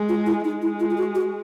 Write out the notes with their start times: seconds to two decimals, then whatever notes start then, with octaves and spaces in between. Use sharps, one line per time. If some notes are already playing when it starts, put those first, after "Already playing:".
Already playing: G#3
0.09 F4
0.26 E4
0.44 G#3 D#4
0.62 E4
0.80 F4
0.91 F4
0.98 F#4
1.15 F#4